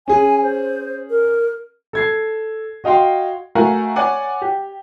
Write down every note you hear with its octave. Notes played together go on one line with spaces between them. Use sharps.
C#4 G#4 G#5
C5
A#4
A4 G#6 C7
F#4 D#5 F5 G5 C6
A3 F#4 A#4 F5 F#5 G#5
C#5 D5 F#5 G#5 D6
G4